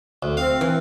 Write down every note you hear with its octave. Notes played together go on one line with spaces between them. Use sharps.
D2
C4 F5
E3